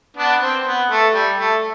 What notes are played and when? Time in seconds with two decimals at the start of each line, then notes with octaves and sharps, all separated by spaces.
0.17 B3 D4
0.41 C4
0.66 B3
0.90 A3
1.14 G3
1.38 A3